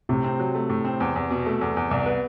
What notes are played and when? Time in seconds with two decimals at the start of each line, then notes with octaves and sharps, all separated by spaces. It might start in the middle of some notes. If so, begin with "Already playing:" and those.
0.09 A2 C3
0.24 C4
0.39 F#3
0.55 A3
0.69 A2
0.85 C4
1.00 E2
1.16 E2
1.30 B2
1.46 A3
1.61 E2
1.77 E2
1.91 C2
2.06 B3